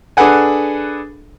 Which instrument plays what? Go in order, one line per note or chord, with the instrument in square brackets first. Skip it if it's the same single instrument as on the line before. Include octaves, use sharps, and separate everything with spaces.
[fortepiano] D4 G#4 A4 B4 F#5 G#5